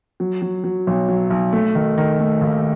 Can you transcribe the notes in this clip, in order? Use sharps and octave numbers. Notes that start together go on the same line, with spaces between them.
F#3
F#3
F#3
B1
F#3
B1
A3
D#3
D#3
A3
D#2